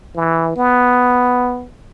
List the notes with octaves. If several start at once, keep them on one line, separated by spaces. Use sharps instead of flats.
E3
B3